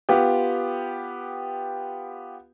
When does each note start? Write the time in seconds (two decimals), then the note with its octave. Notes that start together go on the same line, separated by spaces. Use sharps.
0.09 B3 F4 G4